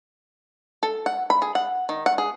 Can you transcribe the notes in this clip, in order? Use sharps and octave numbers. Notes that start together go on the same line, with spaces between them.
A4
F#5
B5
G#4
F#5
D#3
F#5
G#4